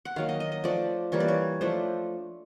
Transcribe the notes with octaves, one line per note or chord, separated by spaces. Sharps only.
F#5
D#3 F#3 A#3 F5
D#5
D#5
D#5
F3 A3 D4 D5
E3 G3 A#3 C#5
D5
C#5
F3 A3 D4 C5